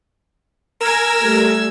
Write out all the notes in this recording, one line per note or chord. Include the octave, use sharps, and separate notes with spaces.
A#4 G#5 E6 G#6 A#6
G3 A3